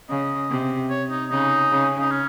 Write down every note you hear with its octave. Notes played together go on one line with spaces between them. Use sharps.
C#3 D#5
C3
C#5
D#4
C#3 D#4
C#3
D#4
C#4